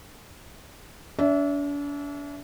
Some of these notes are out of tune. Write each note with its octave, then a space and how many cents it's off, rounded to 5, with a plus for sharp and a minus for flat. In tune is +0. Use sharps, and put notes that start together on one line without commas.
D4 -40 E5 +0